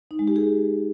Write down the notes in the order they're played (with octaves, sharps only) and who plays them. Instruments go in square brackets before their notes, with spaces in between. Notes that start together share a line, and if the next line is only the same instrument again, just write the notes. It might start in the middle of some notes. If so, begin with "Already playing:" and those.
[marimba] D#4
G#3
G4
G#4